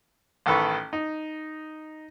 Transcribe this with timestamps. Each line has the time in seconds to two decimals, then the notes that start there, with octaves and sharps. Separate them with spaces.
0.46 A1 D#3 A4 B4 C#6
0.93 D#4